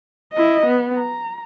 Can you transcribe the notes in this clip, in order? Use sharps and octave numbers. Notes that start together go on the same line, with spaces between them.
E4 D#5
B3
A#5